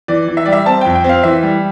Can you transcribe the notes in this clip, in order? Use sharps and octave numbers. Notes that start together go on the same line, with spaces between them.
E3 D5
E3
E5
G3 D5
E5
C4 A5
F2 G5
G5
C4 F5
E3 E5
G3